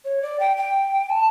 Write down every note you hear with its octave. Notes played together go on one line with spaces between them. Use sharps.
C#5
D5
G5
G5
A5